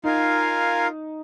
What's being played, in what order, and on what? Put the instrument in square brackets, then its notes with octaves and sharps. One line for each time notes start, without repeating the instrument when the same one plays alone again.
[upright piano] D#4 [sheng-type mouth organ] F4 A#4 F5 G#5